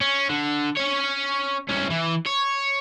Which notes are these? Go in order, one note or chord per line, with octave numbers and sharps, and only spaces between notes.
C#4
D3
C#4 C#5
C2 C#4
E3
C#5